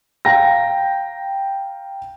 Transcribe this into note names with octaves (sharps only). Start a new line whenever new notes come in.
F5 G5 A#5 A#6